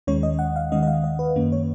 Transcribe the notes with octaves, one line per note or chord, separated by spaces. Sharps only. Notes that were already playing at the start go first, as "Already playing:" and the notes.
D#2 D#3 G#3 C#4 C#5
D#5
F#5
F5
D#2 D#3 G#3 C#4 D#5
D#5
F5
D#5
B4
F#2 D#3 A#3 C#4
C#5